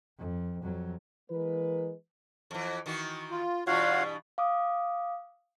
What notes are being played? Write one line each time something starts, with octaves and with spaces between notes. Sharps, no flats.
F2
F2 F#3
E3 G#3 A#3 A#4 B4
F2 E3
D#3 E3 F#4
F4
G2 B2 E3 F4 F#4 C#5 F5 F#5
F5 D6 D#6